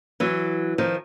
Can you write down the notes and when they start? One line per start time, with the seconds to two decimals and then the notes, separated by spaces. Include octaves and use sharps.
0.20 E3 F#3
0.78 D#3 F3